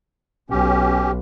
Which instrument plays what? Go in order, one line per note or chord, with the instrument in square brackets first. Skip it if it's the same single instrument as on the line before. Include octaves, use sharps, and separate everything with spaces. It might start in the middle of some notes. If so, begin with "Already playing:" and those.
[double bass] B1 [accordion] C#4 G4